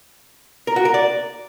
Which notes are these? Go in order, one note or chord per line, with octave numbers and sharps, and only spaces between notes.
A#4
F#4
A#4
D5